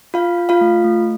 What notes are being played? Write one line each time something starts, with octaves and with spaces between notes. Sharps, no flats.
F4 F5
F4
F4 F5
A3
A3